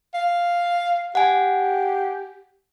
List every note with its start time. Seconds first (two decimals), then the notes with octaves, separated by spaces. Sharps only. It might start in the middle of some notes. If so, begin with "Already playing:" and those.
0.14 F5
1.15 G4 F#5 G#5